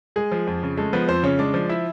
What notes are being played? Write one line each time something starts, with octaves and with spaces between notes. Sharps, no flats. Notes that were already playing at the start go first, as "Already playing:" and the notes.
G#3 G#4
F3
F2
C#3
G#3 A3 A4
F3 B3 B4
F2 C4 C5
C#3 C#4 C#5
G#3 D4 D5
F3
E4 E5